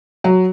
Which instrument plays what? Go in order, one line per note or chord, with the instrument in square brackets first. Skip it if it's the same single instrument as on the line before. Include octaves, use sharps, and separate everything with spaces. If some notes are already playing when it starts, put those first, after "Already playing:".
[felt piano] F#3